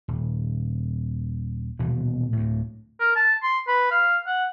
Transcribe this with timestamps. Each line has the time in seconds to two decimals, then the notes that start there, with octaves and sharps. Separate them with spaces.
0.08 D#1
1.79 D#1 B2 E3 B3
2.33 D2 A2
3.00 A#4
3.16 A5
3.43 C6
3.67 B4
3.91 F5
4.27 F#5